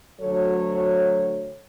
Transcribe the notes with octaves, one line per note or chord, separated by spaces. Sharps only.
D2 F#3 A4 C#5